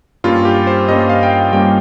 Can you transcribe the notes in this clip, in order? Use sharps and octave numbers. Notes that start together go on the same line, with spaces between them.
G2 G3 A#3 C#4 F4
G4
C5
G2 G3 A#3 C#4 D#5
F5
G5
F5
G2 G3 A#3 C#4 G5